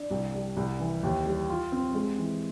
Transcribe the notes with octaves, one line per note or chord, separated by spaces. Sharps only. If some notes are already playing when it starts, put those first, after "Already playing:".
Already playing: D4
C2
G3
C2
E3
D#2
G3
F4
C4
G#3
E3